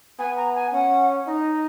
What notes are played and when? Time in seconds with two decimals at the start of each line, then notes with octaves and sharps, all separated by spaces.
0.19 B3 G#5
0.37 A#5
0.55 G#5
0.72 C#4 F#5
1.27 D#4 D#5